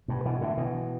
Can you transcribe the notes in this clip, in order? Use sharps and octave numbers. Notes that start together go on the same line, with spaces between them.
G2 B2
B2 E3
A2 D3
B2 E3